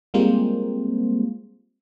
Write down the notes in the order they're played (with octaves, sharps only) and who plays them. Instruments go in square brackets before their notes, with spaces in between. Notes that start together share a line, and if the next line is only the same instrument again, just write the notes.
[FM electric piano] G3 G#3 A#3 C4 F4 C5